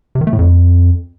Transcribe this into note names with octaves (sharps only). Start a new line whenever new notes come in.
C3
D#3
A3
A2
F2